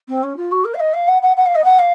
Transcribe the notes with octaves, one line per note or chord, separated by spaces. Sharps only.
C4
C#4
F4
F#4
A#4
F5
D#5
F5
F#5
F#5
F#5
F5
D#5
F#5
F5